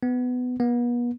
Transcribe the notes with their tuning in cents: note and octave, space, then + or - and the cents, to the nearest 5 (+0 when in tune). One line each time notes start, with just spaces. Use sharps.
B3 +15
B3 -40